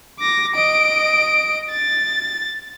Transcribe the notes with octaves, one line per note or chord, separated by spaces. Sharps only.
D6 A#6
D#5 D7
A6